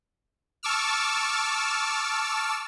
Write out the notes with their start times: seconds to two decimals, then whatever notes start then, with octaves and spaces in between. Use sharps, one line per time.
0.63 A5 C#6 D6 E6 F6